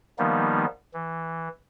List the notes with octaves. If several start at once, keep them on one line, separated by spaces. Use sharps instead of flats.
D#3 F3 G3 A#3 B3 D#4
E3